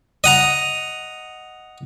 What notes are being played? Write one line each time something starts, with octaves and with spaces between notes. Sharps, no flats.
D#5 F#5 A#5